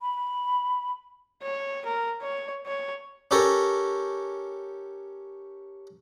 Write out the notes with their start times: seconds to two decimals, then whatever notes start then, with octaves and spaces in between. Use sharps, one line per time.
0.01 B5
1.43 C#5
1.86 A#4
2.22 C#5
2.67 C#5
3.31 C#4 G4 A4 A#4 C#5